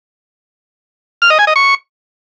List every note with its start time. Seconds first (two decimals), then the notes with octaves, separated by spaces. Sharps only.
1.22 F6
1.30 D#5
1.39 G#5
1.47 D#5
1.56 C#6